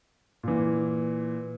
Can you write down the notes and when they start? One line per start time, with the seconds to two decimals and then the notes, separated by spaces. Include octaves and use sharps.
0.43 A#2 E3